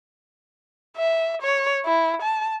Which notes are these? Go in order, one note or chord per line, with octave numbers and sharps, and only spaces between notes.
E5
C#5
E4
A5